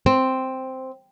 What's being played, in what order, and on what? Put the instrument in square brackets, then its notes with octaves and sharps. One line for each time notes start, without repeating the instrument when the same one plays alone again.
[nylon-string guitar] C4